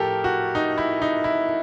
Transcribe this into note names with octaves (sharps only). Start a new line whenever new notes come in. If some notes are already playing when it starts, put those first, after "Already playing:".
Already playing: A2 F3 G4 A4 A#4
F#4
D#4
E4
D#4
E4